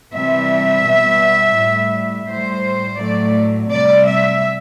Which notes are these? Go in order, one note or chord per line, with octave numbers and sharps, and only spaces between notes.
C3 E3 G3 E5
B2 G3
A2 G3
A2 G3 C5
A2 F#3 A3 D5
C3 G3 D5
E5